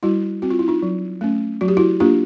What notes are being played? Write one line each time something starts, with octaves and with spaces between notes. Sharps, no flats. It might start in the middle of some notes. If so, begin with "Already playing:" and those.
G3 E4 F#4
C4 F#4
F4
E4
D#4 F4
F#3
A3 C#4
F#3 F#4
G4
E4 F#4
A#3 D4 F4 G4